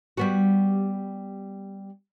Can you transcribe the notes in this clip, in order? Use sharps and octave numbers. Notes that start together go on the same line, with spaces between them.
G3 B3 F#4